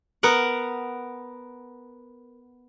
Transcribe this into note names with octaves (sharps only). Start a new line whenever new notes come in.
B3 A#4 F#5